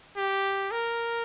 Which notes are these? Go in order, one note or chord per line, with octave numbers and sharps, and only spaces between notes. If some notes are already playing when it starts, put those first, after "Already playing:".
G4
A#4